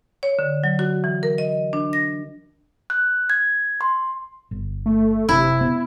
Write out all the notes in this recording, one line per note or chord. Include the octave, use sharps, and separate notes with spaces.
C#5
D3
F#3
F#4
E3
A#4
D#5
D4
A#6
F#6
G#6
C6
G1
A3
F#1 C3 E4
B3